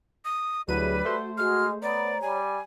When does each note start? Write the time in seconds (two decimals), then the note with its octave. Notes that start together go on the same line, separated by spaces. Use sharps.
0.25 D#6
0.68 D2 F#3 G3 E4 G#4 B4 D#7
1.05 A3 F#4 C5 E5
1.38 G#3 F#4 F6
1.82 B3 C#5 D5 A#5
2.22 G3 G#5